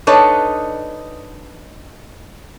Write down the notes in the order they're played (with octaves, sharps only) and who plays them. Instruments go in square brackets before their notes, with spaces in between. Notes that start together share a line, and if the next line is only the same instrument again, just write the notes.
[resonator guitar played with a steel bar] D4 D#4 A4 B4 C#5 D#5